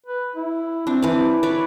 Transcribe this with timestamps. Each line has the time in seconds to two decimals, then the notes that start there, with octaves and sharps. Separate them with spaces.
0.06 B4
0.36 E4
0.87 C4 D4
1.02 E3 D5
1.43 B4 C#5 D5